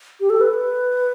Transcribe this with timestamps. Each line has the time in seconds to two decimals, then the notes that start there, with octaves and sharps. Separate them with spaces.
0.20 G4
0.30 A4
0.41 B4